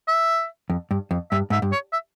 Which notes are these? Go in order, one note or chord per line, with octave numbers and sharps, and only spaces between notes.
E5
F2
G2
F2
G2 E5
G#2 E5
G2
C#5
E5